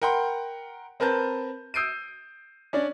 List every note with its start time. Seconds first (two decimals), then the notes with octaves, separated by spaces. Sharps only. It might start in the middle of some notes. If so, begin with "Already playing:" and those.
0.02 A#4 F#5 G5 B5 C6
1.00 C4 A#4 B4 A5 G6
1.74 D#6 E6 G6 C7 D7 D#7
2.73 C#4 D4 D5